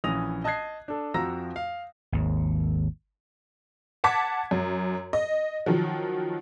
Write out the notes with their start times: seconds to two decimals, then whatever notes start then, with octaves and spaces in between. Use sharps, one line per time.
0.04 A#1 E3 C#4 D#6 A#6 F7
0.44 D#5 A5 D#6 F#6 G#6 C7
0.88 D4 A4
1.14 F2 F3 F#4 A#5 E6 A#6
1.56 F5
2.12 G#1 D#2
4.04 F#5 A5 D6 G#6 B6
4.51 F#2
5.13 D#5
5.66 D#3 F3 F#3